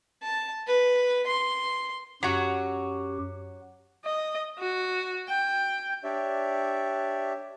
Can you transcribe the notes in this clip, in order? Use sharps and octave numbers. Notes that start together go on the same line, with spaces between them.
A5
B4
C6
F#2 F#3 F#4 G4
D#5
F#4
G5
D4 G4 C#5 D5 E5